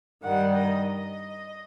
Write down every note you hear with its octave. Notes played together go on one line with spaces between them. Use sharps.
G2 D#3 G3 F#5
D#5
D#5